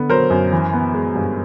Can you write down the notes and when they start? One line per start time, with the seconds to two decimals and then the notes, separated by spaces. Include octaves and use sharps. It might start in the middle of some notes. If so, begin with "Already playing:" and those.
Already playing: D3 B3
0.09 F#3 A#4 C5
0.30 F#2
0.52 E3
0.73 B3
0.94 G#3
1.15 G2